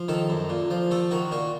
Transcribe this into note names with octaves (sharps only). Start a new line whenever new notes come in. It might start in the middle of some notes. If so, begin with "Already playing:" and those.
Already playing: F3
D#3 A4
F#2
A#2
F3
A3 A4
D#3 F#4
A#2 F#4